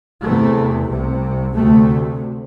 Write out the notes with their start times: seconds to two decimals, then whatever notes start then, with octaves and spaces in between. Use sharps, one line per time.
0.22 E2 C3 A3
0.89 C2 C3
1.54 D2 C3 A3